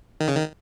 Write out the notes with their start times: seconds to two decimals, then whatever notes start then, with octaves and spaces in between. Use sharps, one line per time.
0.20 D#3
0.28 C#3
0.35 D#3